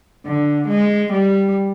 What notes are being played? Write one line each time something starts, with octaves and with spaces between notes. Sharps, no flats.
D3
G#3
G3